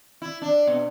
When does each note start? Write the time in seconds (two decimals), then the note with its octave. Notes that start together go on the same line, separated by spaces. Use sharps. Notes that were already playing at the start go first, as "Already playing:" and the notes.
0.22 E4
0.42 D4
0.67 B2